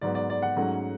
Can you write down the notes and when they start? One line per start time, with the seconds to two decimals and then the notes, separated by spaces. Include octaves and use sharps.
0.01 G#2 F#3 B3 D5
0.15 D5
0.30 D5
0.42 F#5
0.56 G#2 F#3 A3 C#4